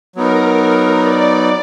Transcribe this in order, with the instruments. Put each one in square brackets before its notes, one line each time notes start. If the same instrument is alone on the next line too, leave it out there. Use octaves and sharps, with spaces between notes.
[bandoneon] F#3 B3 D#4 [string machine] A#4
[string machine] D5